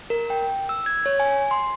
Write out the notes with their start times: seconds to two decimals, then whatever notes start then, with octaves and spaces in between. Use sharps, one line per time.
0.10 A#4
0.30 G5
0.69 E6
0.86 G#6
1.06 C#5
1.20 G#5
1.51 C6